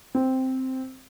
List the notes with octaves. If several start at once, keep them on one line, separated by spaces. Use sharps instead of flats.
C4